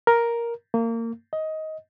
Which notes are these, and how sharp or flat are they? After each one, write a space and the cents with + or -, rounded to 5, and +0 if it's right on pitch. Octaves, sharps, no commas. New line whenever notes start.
A#4 +5
A#3 -25
D#5 +15